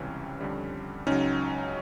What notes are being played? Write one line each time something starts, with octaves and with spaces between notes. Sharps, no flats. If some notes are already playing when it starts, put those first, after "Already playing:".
Already playing: C#2 C3 E3 G3 C#4
F2 D3 G3
C#2 C#3 F#3 C#4 D#4